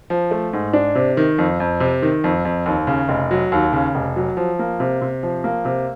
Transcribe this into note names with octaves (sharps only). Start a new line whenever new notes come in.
F3
A3
G#2
D4
C3
D#3
F2
F2
C3
D#3
F2
F2
D#2
C#3
F1
F#3
D#2
C#3
F1
F#3
F3
A#3
C3
C3
F3
A#3
C3